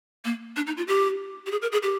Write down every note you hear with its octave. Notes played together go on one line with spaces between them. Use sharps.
A#3
D4
D#4
F4
G4
G4
G#4
A#4
G#4
G4